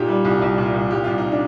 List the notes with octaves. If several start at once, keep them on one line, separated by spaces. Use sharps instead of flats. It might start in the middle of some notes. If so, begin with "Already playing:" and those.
Already playing: A#2 D#4 G4
G3
C2
C2
A#2
C2
C2 G4
C2 F4
D#4
D4